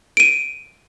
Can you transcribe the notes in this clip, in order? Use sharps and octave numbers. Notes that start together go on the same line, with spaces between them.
D7 D#7